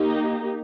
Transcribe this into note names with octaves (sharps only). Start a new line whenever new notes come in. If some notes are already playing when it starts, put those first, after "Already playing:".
Already playing: A#3 D#4 G4